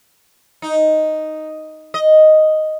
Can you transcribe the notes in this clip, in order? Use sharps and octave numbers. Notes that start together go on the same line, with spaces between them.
D#4
D#5